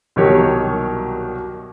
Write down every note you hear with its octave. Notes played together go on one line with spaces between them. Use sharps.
C2 B2 D#3 F#3 G4 C#5